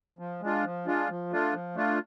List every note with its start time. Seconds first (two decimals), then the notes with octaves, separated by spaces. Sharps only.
0.19 F3
0.41 G#3 D4 F4
0.64 F3
0.86 G#3 D4 F4
1.10 F3
1.32 A3 D4 F4
1.53 F3
1.76 A3 D4 F4